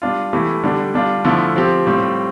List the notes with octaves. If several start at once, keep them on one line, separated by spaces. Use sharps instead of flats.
G3 D4 F4
E3 A3 E4 G4
D3 G3 D4 G4
G3 D4 F4
D3 F3 A3 E4
F3 C4 G4
A2 G3 C4 F4